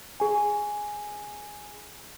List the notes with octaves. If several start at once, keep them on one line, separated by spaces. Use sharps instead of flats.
G#4 G#5